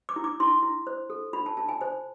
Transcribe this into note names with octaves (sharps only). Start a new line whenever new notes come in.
D6
E4
D6
E4 C6
E4
C5
A4
F4 B5
A5
F4 A5
G#5
C5 G#5